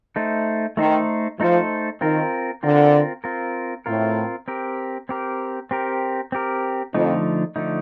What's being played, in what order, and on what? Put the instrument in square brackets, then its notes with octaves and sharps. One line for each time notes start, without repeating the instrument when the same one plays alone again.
[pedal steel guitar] A3 D#4 A4 C5
[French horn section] D#3 [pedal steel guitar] A3 D#4 A4 C5
[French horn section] F3 [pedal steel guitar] A3 D#4 A4 C5
[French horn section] D#3 [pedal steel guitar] C4 F4 A#4
[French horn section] D3 [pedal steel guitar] C4 F4 A#4
[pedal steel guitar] C4 F4 A#4
[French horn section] A2 [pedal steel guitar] C4 F4 A#4
[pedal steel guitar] C4 G4 A#4
C4 G4 A#4
C4 G4 A#4
C4 G4 A#4
[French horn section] F2 [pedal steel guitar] D3 F3 A3 D#4
[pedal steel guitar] D3 F3 A3 D#4